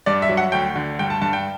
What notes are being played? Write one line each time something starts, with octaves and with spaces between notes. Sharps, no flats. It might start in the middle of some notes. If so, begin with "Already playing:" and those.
G2 D5
E5
F#3
F#5
D2 G5
D3
G2 G5
A5
G2 A5
G5